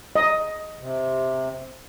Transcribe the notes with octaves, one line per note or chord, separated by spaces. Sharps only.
D#5
C3